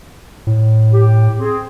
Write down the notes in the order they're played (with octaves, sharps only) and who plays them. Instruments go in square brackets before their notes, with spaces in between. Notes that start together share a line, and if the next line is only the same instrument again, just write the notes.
[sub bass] A2
[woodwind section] G4
C4 G#4